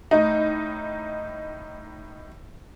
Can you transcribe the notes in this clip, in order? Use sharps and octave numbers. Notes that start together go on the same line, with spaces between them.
A2 D#4